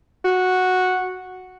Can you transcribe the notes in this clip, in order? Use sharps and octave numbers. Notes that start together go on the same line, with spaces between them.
F#4